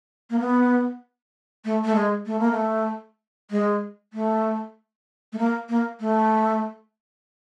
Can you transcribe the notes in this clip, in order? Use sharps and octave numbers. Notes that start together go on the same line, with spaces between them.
A#3
B3
A3
A3
G#3
A3
A#3
A3
G#3
A3
A3
A#3
A#3
A3